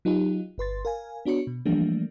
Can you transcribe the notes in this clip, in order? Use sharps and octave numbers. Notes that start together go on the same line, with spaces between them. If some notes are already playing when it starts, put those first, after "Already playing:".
F#3 D#4 F4 G4
G1 B4 C6 A6
A#4 F5 G#5
B3 D4 F#4 C#5 C#7
B2
E3 F3 G3 A3 A#3 D4